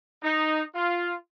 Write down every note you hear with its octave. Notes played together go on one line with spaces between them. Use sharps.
D#4
F4